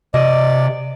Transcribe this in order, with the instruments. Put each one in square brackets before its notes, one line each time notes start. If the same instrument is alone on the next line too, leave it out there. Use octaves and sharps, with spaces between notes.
[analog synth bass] C3 [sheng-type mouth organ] D5 [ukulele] D#5